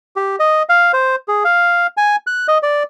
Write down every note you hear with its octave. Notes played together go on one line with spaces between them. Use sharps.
G4
D#5
F5
C5
G#4
F5
G#5
F#6
D#5
D5